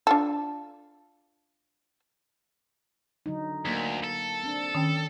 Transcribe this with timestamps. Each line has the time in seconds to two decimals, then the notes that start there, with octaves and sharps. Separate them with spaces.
0.07 D4 F4 A4
3.26 D3 F#3 D#4
3.65 D2 F#3 A#3
4.04 A4
4.44 C4 D4
4.75 D#3 C#4 G5